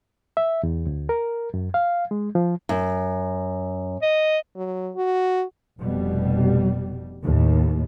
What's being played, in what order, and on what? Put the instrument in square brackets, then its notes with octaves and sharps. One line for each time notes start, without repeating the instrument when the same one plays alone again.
[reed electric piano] E5
E2
D2
A#4
F#2
F5
G#3
F3
[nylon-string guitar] F#2
[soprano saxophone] D#5
[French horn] F#3
F#4
[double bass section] F1 B2 G3
D#2 A2